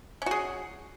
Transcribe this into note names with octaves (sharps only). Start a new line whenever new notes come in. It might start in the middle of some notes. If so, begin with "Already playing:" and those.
C#4 F#4 G#4